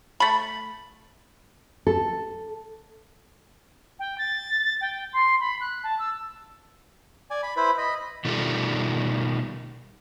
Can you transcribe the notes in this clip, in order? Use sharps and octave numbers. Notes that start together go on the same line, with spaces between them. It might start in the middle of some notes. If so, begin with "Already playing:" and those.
A3 B5
A4
G5
A6
G5
C6
B5
F#6
A5
E6
D5 G#5
B5
E4 B4 C5 B5
D#5 B5
B2 D#3 G3 A3 F4 A4